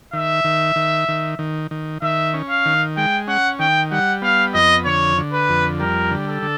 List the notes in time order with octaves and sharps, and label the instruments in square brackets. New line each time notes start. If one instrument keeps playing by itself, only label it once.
[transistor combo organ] D#3 [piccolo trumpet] E5
[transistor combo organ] D#3
D#3
D#3
D#3
D#3
[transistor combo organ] D#3 [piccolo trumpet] E5
[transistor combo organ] C#4
[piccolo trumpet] F5
[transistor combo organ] D#3
[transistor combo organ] G#3 [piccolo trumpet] G5
[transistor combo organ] C#4 [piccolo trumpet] F#5
[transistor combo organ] D#3 [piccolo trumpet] G5
[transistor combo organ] G3 [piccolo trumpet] F#5
[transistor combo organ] B3 [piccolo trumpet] F5
[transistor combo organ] F2 [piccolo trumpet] D#5
[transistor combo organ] D3 [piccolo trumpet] C#5
[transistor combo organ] D3
[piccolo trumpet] B4
[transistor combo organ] F2
[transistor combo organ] G3 [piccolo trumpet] A#4
[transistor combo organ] D3
[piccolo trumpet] A4
[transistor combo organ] D3